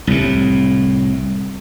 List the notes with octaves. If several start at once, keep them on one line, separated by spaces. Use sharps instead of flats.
C2 A2